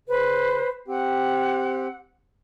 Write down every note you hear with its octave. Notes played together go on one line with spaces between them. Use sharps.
C#3 B4 C5
C4 G4 F#5